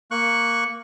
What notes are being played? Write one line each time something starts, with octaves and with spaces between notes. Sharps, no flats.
A#3 C#6 F#6